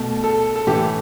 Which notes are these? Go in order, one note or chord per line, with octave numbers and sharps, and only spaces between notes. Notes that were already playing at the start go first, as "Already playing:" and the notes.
Already playing: B2 A3
A4
A4
A2 E3 A3 G4